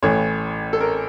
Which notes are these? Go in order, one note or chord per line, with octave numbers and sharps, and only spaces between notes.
A1 A2 E3 A3 C#5
A4
A#4